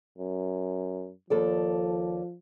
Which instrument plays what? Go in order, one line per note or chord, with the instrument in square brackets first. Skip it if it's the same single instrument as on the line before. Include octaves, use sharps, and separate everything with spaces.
[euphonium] F#2
[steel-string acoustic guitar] D#2 A4 D5 [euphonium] F3